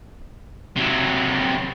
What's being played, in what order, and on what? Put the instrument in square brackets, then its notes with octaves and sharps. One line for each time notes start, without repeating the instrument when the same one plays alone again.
[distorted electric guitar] C3 F#3